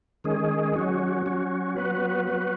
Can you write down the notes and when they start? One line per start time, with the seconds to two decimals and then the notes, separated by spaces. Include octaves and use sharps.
0.24 D#3 G#3 C#4 G#4
0.76 F#3 C#4 F#4
1.26 F#3 C#4 F#4
1.77 F#3 B3 F#4 B4
2.28 F#3 B3 F#4 B4